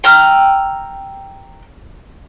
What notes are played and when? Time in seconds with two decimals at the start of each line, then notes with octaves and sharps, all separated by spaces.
0.04 G5 A#5 E6 F6